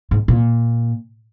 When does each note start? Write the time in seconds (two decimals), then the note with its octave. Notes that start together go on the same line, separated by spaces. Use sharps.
0.11 G#2
0.28 A#2